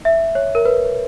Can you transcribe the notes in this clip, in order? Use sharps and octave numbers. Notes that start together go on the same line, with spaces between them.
E5
C#5
A#4
B4